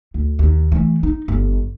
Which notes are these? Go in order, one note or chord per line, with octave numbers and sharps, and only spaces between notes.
D2
D#2
E3 A3
D#4
G1